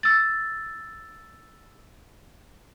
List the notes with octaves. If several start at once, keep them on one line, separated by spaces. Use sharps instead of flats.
E6 A6